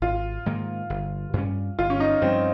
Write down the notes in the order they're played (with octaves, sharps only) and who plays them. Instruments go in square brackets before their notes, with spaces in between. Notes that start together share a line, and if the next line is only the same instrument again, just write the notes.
[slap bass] G#1 [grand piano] F4
[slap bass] G#2 D#3 A#3
G1
G2 G3 C#4
[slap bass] G1 [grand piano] F4
[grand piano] C#4
D#4
[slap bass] G2 F3 [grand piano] C4